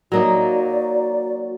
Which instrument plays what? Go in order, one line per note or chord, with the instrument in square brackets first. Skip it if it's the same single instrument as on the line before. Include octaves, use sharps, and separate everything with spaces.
[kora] F#3 A#3 D#4 [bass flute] F#4 [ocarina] D5